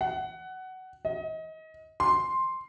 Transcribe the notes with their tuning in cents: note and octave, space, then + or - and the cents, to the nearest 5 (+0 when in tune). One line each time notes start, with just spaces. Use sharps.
F#5 +15
D#5 +30
C6 +5